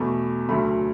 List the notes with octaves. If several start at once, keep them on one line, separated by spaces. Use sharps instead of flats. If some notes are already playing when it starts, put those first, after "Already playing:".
Already playing: E2 B2 A3 B5
D2 C#3 F#3 A3 B5